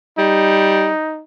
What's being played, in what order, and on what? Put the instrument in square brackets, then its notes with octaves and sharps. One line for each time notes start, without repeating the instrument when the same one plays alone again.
[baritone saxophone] G3 [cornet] D#4